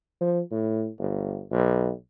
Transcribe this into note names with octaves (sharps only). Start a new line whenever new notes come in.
F3
A2
G1
B1